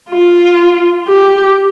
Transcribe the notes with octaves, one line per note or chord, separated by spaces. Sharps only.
F4
G4